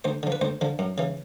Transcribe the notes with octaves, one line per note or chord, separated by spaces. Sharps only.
D2 C5
D3 F3
B4
D2 C5
D3 F3
F#2
C#3 E3